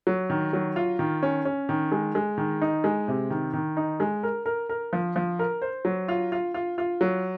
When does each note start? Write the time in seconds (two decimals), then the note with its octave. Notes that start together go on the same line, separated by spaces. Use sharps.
0.07 F#3
0.30 D#3
0.53 F#3
0.76 F4
0.99 D#3
1.23 C#4
1.45 C#4
1.69 D#3
1.92 G#3
2.15 G#3
2.38 D#3
2.61 D#4
2.84 G#3
3.08 C3
3.30 D#3
3.53 D#3
3.77 D#4
4.00 G#3
4.23 A#4
4.46 A#4
4.69 A#4
4.93 F3
5.16 F3
5.39 A#4
5.62 C5
5.85 F#3
6.08 F4
6.32 F4
6.54 F4
6.78 F4
7.01 F#3